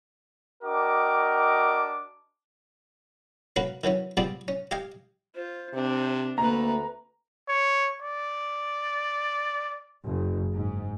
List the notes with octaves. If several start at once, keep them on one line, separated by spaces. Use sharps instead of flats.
D4 F#4 A#4 D#5 G5 D6
A#3 C#4 F#4 A#4 B4
D#3 E3 F#3 C#4
F3 G3 B3 C4 G#4 D5
C#4
G4 D#5 F5 G#5
F4 C5
C3 C4 D4
D2 A3 A#3 B4 A#5
C#5
D5
F#1
G#2